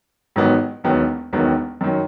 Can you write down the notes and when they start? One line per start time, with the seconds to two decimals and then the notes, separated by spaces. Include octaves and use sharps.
0.36 A1 G#2 D#3 F#3 B3
0.84 E1 D#2 D#3 F#3 B3
1.33 E1 D#2 D#3 F#3 B3
1.81 F#2 D#3 F#3